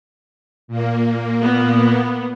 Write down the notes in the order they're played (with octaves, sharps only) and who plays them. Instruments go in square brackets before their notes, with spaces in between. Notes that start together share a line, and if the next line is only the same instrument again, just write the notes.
[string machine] A#2 A#3
[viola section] B3